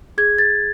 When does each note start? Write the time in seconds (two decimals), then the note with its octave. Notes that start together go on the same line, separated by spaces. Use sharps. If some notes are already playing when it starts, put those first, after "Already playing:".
0.18 G#4 G#6
0.38 A6